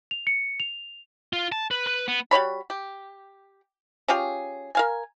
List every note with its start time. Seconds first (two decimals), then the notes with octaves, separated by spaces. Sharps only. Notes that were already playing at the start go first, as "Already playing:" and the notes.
0.11 F7
0.27 C#7
0.60 F7
1.33 F4
1.52 A5
1.71 B4
1.87 B4
2.08 B3
2.31 G3 F#4 C#5 B5
2.70 G4
4.08 C#4 F4 G4 G#4
4.75 A#4 F5 G#5